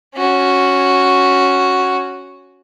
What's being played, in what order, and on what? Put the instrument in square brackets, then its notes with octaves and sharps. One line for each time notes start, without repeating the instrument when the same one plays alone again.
[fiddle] C#4 F#4